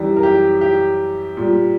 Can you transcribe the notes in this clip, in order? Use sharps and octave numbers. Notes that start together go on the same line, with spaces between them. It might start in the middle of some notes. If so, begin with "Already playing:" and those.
Already playing: F#2 E3 G3
A#4
G4
G4
A#2 G3